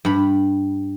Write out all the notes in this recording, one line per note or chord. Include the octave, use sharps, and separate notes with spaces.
G2 B5